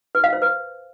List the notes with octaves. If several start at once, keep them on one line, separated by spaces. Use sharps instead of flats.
B4
F5
C5
B4